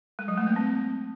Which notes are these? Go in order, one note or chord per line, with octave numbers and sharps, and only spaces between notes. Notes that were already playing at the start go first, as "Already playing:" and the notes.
G#3
F#3
A3
A#3
C4